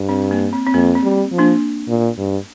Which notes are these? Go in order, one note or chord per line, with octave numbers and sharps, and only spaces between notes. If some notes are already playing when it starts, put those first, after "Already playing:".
Already playing: G2
C4
A#3
C4
C4
F2 A#3
C4
G3
F3
A#3 D4
A#2
G2